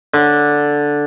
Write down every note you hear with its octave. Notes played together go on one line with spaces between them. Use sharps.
D3